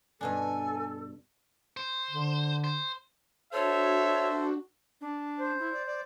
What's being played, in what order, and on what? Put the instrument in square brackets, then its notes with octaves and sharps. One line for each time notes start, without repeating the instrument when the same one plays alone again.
[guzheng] G2 B2 D4 [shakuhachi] A4 [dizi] G#5
[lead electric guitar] C5
[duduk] D3
[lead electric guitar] C5
[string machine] D4 F#4 [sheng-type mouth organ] A4 C5 [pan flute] C#5 [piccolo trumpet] E5
[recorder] D4
[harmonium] C5
[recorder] E4
D5
D5